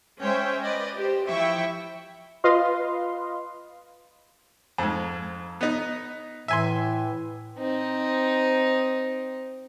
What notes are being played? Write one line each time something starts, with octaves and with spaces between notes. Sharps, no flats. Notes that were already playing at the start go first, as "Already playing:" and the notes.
G#3 C#4 C5 C#5 E5 G5
B4 D5 D#5
G4 C5
F3 E4 E5 G5 C#6
F4 B4 D#5 F5 C6
F2 G#2
B3 D#4
A2 E3 E5 G#5 C6
C4 D#4